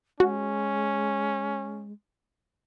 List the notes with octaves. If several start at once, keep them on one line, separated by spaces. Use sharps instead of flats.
G#3 C#4 F#4